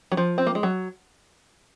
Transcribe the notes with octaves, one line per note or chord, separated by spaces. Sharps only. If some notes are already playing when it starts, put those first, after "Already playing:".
F#3
F3
C4
A#3
G#3
F#3